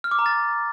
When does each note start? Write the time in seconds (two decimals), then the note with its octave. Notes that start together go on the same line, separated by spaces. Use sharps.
0.04 F6
0.11 D6
0.19 A#5
0.26 A6